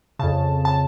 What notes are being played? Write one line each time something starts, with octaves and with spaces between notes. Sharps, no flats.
F2 C#3 A5
A5